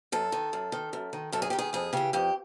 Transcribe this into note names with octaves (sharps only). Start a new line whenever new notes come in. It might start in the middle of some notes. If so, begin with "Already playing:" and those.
F#2 A4
D#3
F#2
D#3
F#2
D#3
F#2 A4
G#4
D#3 G4
G#4
F2 G#4
C#3 E3 G4
F2 G4